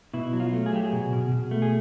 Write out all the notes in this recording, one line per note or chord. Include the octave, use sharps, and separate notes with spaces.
B2 E4
F#3
F4
A3
G#4
F#3 G4
G#4
B2
B2
B2
A3
G#4